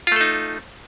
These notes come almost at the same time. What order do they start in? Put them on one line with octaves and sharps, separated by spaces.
F4 A3 A4 D#4